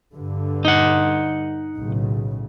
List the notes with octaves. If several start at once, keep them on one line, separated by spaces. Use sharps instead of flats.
G2 D3
D#4 F#5
B1 A2 C#3